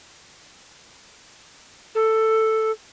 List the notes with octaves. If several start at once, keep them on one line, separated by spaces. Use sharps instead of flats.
A4